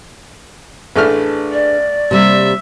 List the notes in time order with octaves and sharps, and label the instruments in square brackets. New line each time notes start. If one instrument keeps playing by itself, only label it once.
[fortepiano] A1 A3 F6 [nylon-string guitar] D4 G#4 B4
[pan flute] D5
[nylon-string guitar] C3 G3 A#3 [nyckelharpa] E5